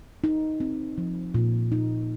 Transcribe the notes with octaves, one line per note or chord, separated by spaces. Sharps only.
D#4
C4
F3
A#2
D#4